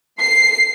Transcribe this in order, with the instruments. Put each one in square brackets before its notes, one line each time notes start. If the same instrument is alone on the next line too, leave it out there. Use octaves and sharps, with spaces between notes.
[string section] C7